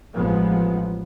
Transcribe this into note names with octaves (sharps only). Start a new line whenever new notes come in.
A1 F3 G#3 B3